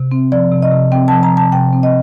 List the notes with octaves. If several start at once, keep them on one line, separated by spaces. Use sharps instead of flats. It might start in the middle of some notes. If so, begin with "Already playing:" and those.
Already playing: C3
C4
F3 D5
C3
D#5
C3
C4 G5
A5
F3
A#5
C3 A5
C3 G5
C4
D#5